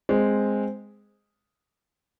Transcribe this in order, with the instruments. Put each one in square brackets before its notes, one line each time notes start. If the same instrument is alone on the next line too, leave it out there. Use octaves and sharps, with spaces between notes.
[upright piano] G#3 C4